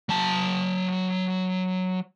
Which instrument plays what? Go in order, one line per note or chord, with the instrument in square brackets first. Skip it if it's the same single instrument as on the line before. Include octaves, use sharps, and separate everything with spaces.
[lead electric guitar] F#3 A5